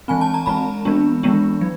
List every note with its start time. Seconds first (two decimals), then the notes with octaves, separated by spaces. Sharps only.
0.08 E3 G#3 C4 G#5
0.21 A5
0.34 A#5
0.46 E3 G#3 C4 B5
0.85 E3 G#3 B3 D4
1.23 E3 G#3 B3 D4
1.61 F#3